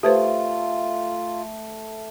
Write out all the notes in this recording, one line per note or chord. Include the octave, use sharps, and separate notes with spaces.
A3 F4 G4 B4 C5